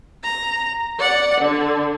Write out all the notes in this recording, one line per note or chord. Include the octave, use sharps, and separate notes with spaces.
A#5
D5 F#5
D3